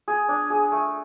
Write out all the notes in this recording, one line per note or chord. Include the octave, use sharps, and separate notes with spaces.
G#4
D4
G#4
A3